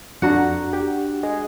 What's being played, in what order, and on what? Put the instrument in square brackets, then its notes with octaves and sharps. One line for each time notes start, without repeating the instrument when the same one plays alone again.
[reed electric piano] F2 A#5 [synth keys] D4 F#4 F#5
[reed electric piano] G4
G#4 D#5